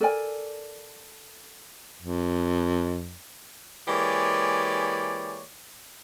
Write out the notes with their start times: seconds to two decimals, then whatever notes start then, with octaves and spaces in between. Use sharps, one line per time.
0.01 A4 A#4 D5 G#5
2.02 F2
3.88 E3 G#3 A#3 G4 C#5 D5